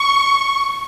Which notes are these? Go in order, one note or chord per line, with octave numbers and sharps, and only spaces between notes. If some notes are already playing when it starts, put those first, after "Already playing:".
Already playing: C#6